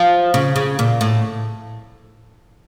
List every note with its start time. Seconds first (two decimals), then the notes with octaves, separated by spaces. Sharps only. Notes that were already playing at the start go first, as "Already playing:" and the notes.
Already playing: F3
0.34 C#3
0.56 C#3
0.79 A#2
1.01 A2